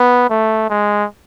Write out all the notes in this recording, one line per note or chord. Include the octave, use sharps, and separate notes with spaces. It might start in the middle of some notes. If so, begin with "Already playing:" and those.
Already playing: B3
A3
G#3